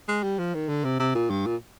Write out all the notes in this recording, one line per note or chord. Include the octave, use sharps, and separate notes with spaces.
G#3
G3
F3
D#3
D3
C3
C3
A#2
G2
A#2